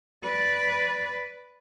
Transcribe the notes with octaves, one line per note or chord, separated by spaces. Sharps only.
B4 D5